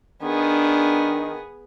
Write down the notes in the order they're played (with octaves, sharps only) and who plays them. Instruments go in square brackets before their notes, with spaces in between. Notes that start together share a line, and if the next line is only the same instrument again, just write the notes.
[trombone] D#3 [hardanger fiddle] B3 G#4 [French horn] D4